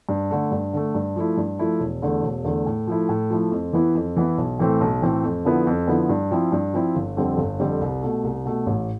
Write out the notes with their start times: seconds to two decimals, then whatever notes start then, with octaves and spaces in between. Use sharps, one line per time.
0.09 G2
0.30 D3 A3
0.51 G2
0.73 D3 A3
0.95 G2
1.16 F3 A3 E4
1.37 G2
1.59 F3 A3 E4
1.80 E1
2.02 E2 D3 A3
2.23 E1
2.44 E2 D3 A3
2.66 A2
2.87 F3 A3 E4
3.09 A2
3.30 F3 A3 E4
3.52 F2
3.73 E3 B3 E4
3.95 F2
4.16 E3 B3 E4
4.38 B1
4.59 A2 E3 A3 C4
4.81 B1
5.02 A2 E3 A3 C4
5.23 F2
5.45 D3 F3 B3 E4
5.67 F2
5.88 D3 F3 B3 E4
6.09 G2
6.31 F3 C4 E4
6.52 G2
6.74 F3 C4 E4
6.96 G1
7.17 F2 D3 G3 C4
7.38 G1
7.60 F2 D3 G3 C4
7.81 C2
8.03 B2 A3
8.24 C2
8.45 B2 A3
8.66 A1